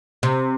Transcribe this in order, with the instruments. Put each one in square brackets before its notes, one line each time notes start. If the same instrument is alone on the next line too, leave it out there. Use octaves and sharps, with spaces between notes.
[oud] C3